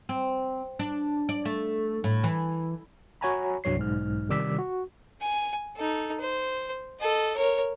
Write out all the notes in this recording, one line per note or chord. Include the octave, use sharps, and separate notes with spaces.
C4
D4
D5
A3
A2
E3
F#4 C#5 F#5 G#5 A#5 B5
C2 G2 F#3 C#5 C7
B1 G#2 F6
C3 D#3 G3 D6 E6 B6
F#4
G#5
D#4 A4
C5
A4 D#5
A#4 C#5